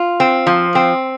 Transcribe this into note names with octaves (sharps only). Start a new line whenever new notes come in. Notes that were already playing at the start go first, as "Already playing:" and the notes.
Already playing: F4
C4
F3
C4